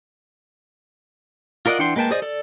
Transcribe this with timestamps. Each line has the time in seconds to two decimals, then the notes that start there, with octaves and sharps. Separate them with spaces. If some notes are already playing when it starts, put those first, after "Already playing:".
1.66 F4 A#4 D5 D#5 F#5
1.79 E3 D4 F#5 G5 C6
1.96 G#3 A#3 B4 G5 A5
2.11 G#4 C5 D5 D#5 D#6
2.22 A4 D5